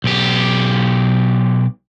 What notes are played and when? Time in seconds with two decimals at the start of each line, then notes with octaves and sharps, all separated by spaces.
0.04 B1 G4